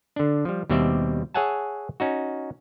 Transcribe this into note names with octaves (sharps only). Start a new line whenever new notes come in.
D3 D4
F3 G3
D#2 B2 G3 C4 D5 E5
G#4 C#5 E5 F#5 G#5 A5
C#4 D#4 F#4